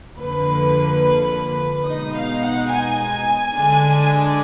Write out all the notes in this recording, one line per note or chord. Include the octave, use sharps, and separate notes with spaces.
F2 D3 F3 A#3 B4
B2 G#3 D#4 D#5
F5
F#5
G#5
D3 G#3 D4